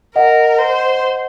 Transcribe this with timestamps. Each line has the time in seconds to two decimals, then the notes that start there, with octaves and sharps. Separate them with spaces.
0.16 A#4 D#5 F#5
0.59 C5